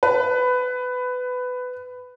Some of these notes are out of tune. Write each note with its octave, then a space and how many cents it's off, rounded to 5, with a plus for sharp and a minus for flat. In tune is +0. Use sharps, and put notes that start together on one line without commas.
B4 +20